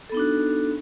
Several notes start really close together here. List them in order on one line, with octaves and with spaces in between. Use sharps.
A4 B3 D#4 D4 F#4